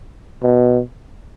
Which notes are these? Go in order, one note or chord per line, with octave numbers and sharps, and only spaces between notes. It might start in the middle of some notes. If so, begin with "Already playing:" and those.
B2